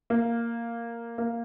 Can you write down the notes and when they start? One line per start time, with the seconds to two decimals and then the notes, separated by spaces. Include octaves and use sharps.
0.10 A#3
1.18 A#3